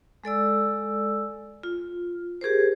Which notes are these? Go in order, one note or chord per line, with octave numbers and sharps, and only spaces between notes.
G#3 A4 D5 E6
F4
G4 G#4 A#4 C5